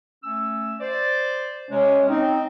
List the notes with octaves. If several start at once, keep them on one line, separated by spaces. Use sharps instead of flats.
A3 C#4 E6
C5 D5
C3 G#3 C#4
C4 D#4